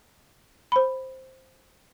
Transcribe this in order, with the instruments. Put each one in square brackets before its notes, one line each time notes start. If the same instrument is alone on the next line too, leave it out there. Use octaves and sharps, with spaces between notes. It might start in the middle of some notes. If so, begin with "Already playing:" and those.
[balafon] C5 B5